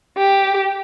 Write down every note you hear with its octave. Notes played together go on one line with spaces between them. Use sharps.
G4